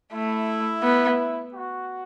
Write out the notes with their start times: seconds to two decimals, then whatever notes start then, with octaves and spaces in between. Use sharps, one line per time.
0.13 A3 E4
0.83 B3
1.54 F#4